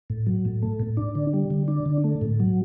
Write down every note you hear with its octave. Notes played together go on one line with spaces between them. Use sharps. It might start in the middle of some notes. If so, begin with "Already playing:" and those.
A2
F#3
A2
A3
A2
D4
D3
G3
D3
D4
D3
A3
A2
F#3